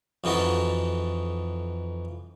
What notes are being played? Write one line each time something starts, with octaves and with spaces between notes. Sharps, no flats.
F2 E3 D#4 F#4 A4